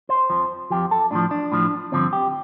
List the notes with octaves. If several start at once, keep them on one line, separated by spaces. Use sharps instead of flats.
C5
F2 F3
F2 F3 G4
A4
A2 F3 D4
D4
A2 F3
G2 D3 F3 C4
G4